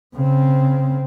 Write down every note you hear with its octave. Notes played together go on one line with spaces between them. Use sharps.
C#3 C4